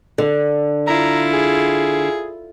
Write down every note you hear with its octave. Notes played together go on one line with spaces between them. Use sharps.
D3
E4 F4 A#5
G#4